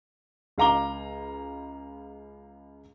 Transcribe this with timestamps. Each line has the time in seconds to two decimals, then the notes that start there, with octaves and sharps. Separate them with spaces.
0.58 C#2 F5 A#5 D6 G7